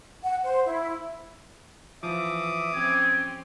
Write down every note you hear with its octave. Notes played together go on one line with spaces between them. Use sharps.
F#5
C5
E4
E3 F3 E5 D6 D#6
C4 C#4 G4 G#6